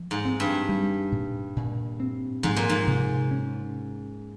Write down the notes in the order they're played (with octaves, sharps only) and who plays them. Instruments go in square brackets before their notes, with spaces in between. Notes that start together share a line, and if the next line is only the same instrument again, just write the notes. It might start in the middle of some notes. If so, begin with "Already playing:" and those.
Already playing: [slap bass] F3
[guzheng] G#2
[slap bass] C4
[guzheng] G2
[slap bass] G3
A#2
A#2
C4
[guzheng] G#2 [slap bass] F3
[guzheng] A#2
G#2
[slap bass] C3
C#4